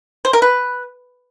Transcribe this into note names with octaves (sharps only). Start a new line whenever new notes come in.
C5
A#4
B4